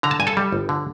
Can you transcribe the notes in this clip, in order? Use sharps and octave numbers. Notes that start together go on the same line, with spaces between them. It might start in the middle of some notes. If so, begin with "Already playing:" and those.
D3 A#5
A5
G2 G#5
A4 A5
G3
G1
D3